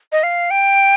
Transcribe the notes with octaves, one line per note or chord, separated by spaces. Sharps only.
D#5
F5
G5